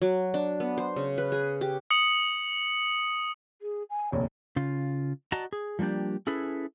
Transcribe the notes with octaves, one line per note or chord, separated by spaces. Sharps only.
F#3
D4
B3
C5
C#3
B4
G#4
G4
D#6 C#7 F#7
G#4
G#5
F1 A#1 D#2 C#5
C#3 F4
F#4 D5 D#5 A5 A#5
G#4
F3 G3 A#3 D4 G4
C#4 E4 G#4 A4 B4